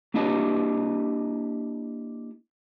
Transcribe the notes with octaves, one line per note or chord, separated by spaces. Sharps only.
A#3 D4 E4 G4 D#5 A5